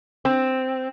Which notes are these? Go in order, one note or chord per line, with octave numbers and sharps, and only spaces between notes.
C4